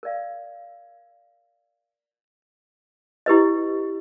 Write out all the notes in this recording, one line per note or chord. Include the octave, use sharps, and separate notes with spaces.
A#4 D5 F5
E4 G4 B4 D#5